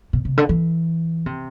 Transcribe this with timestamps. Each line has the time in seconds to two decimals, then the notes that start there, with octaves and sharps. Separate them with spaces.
0.13 B2
0.25 C3
0.37 D3
0.49 E3
1.26 C3